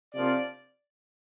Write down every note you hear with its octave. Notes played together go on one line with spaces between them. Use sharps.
C3 F3 A#3 D4 D5